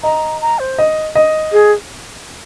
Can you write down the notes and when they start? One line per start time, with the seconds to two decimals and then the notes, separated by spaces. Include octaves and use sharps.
0.03 D#5 A#5
0.41 A#5
0.59 C5
0.78 D#5
1.15 D#5
1.52 G#4